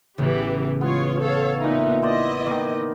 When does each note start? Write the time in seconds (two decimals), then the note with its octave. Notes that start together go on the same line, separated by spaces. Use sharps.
0.18 A1 C#3 E3 B3 G4
0.81 G#3 B3 F4 C#5
1.21 A4 C#5 F5
1.60 A#2 B3 D#4 E4
2.02 B3 E4 C5 D5 D#5
2.47 D#3 A#3 D6